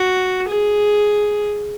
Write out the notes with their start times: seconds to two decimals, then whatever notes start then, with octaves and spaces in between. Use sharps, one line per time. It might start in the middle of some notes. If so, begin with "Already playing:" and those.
Already playing: F#4
0.48 G#4